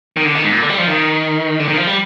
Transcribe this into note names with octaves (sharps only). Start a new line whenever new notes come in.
D#3
D3
D#3
G#2
A#2
D3
G3
F3
D#3
D3
D#3
F3
G3